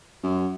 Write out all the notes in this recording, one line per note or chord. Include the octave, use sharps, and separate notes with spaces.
F#2